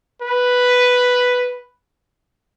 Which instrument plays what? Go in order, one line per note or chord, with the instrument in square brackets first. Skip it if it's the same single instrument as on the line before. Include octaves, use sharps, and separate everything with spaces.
[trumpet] B4